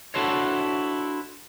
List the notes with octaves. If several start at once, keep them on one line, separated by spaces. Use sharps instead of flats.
D4 E4 F#4 A4 C5 C#5